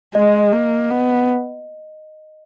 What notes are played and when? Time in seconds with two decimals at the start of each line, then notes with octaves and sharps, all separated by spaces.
0.15 G#3 D#5
0.53 A#3
0.90 B3